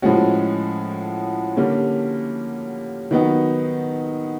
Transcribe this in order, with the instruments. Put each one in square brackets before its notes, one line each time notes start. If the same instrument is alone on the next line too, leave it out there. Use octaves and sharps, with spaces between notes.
[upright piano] A2 F3 G#3 C#4 F#4
D3 G3 A#3 C#4
D#3 F#3 B3 D#4 F#4